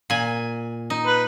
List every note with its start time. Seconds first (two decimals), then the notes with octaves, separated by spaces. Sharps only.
0.10 A#2 G#5
0.90 D#4
1.07 B4